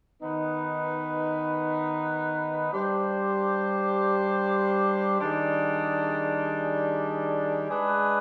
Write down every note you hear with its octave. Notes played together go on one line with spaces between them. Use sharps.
D#3 B3 D#4 B4
G3 D4 G4 C5
D#3 G3 D4 G#4
G#3 D4 G#4 B4